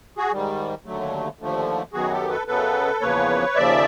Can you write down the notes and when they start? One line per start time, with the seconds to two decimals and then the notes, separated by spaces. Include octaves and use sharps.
0.18 F#4 G#4
0.32 G#2 D#3 G3
0.85 D#2 D3 F#3 A3
1.39 D#2 D3 F3 A3
1.93 F#2 D#3 F#3 B3 F#4 G#4
2.11 G4 A4
2.29 A4 B4
2.47 F#2 C#3 F#3 B3 A4 B4
3.01 E2 C#3 F3 A#3 B4 C#5
3.55 D#2 C#3 F3 D5 E5